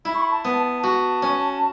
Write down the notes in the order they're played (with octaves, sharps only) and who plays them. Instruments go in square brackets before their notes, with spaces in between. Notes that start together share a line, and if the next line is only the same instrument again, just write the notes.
[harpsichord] E4 [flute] B5
[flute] C#6
B5
A5
[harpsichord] B3
[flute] A5
[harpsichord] F#4 [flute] A5
[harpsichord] C#4